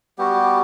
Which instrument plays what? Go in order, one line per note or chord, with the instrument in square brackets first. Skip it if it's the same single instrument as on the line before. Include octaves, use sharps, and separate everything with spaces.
[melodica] G3 B3 F#4 G4